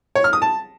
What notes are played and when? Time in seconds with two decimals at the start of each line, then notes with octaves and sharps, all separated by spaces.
0.15 C#5
0.24 F6
0.33 D#6
0.42 A5